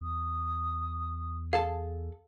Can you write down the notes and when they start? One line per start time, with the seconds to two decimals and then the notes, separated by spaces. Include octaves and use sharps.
0.01 E2 D#6
1.53 G#4 A4 F5 A5